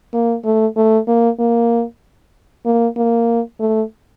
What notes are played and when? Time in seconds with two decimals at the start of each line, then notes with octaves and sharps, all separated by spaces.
0.14 A#3
0.45 A3
0.76 A3
1.08 A#3
1.39 A#3
2.65 A#3
2.97 A#3
3.60 A3